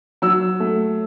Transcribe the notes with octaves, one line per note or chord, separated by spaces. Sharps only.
F#3 E6
A3